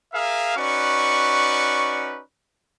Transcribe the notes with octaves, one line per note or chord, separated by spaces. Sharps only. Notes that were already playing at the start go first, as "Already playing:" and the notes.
G#4 A#4 E5 F5
C#4 D#4 F#4 B4 D5 C#6